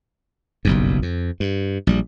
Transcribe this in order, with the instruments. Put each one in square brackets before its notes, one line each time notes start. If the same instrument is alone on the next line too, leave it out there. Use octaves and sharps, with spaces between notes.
[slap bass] F#1 B1 G2
F2
G2
A#1 G3